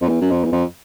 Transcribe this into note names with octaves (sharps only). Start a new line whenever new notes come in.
F2
E2
F#2
F2
E2
F2